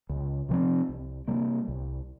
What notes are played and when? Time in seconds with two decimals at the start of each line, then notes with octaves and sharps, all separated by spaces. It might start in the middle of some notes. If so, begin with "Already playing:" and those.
0.09 C#2
0.49 C3 F3 C4
0.89 C2
1.28 C3 G3 A#3
1.68 C2